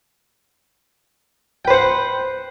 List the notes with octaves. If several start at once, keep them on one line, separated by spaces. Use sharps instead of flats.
B4 C5 F#5 G5